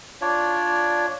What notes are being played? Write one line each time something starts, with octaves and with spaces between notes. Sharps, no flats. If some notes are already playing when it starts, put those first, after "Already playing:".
D4 F4 C#5 D5